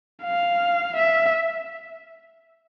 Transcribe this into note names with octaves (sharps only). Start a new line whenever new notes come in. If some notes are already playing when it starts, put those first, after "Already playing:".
F5
E5